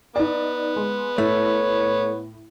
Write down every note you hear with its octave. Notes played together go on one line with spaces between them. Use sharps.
B3 D#4 D5
G#3
A2 A3 C#5